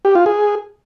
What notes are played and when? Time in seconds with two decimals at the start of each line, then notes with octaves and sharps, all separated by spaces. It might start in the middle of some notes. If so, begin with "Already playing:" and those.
0.05 G4
0.15 F4
0.26 G#4